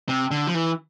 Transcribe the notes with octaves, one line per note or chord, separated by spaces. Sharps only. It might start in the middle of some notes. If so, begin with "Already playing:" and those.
C3
D3
F3
E3